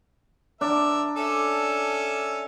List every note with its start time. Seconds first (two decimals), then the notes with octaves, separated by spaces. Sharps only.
0.61 D4 A#4 E5
1.16 C#4 A4 E5